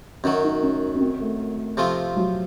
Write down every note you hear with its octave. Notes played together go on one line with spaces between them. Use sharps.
F#2 D#3 F#3 C#4
D#4
C#4
C#4
C4
A3
C3 F3 A3 C4 F4
F#3